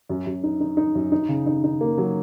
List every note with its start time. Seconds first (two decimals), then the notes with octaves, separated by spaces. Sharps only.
0.09 F#2
0.26 F#2
0.44 D#4
0.60 D#4
0.77 D#4
0.95 F#2
1.12 D#4
1.29 C#3
1.46 D#4
1.64 D#4
1.81 A#3
1.98 F#3